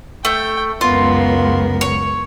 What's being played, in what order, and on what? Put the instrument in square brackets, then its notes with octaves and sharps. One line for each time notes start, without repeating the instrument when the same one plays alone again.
[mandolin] A3 [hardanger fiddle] G5
[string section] C#2 F#2 [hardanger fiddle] B3 A#4 [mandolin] F4
[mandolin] C#5